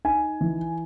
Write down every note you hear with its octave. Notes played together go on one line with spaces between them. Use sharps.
D#4 G#5
E3